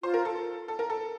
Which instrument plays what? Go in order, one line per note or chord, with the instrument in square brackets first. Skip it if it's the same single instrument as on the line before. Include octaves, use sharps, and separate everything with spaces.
[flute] F4 [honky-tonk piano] C5
[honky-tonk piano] A#4
A4
A4
A#4
A4